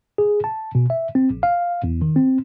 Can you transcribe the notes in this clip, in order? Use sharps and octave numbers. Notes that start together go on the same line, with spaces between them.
G#4
A5
B2
E5
C4
A#1
F5
E2
D#3
C4